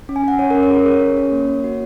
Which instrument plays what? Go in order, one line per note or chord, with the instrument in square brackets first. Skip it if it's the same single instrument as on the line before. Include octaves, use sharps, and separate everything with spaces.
[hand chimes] C#4
G#5
C#4 F#5
C#4 C#5
C#4 A#4
C#5
G#4 A#4
G#4 C#5
C#4
C#4
A#3
A#3
F#4